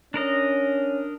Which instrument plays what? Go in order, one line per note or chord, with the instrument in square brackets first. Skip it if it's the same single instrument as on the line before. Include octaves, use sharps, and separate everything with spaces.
[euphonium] C#4 [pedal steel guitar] D4 A#4 D#5